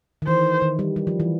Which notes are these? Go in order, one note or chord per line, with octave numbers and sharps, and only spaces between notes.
D#3
E3 C5
D#3
G3
G3
F3
E3